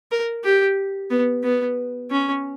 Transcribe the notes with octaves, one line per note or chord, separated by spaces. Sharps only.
A#4
G4
B3
B3
C#4